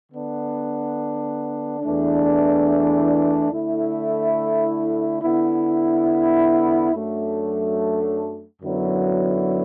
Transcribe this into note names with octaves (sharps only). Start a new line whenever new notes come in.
D3 B3 D4
E2 E3 A3 D4
D3 A3 E4
D3 B3 E4
F#2 F#3 A3 D4
F#2 D3 F#3 B3 E4